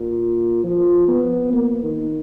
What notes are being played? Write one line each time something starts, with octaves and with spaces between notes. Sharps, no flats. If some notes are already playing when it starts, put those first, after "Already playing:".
Already playing: A#2
F3
B3
A#3
D#3